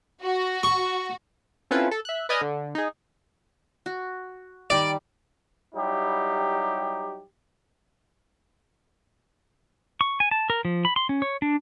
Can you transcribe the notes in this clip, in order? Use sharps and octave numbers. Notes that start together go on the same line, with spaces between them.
F#4
C#6
C4 C#4 E4 F4 A4 B4
A4
E5 F#6
B4 D5 D#5 G#5 D#6 F6
D3
D#4 G#4
F#4
D#3 G3 D5 D6
F#3 G3 D#4 E4 G4
C#6
G#5
A5
A#4
F3
B5
C6
C#4
C#5
D4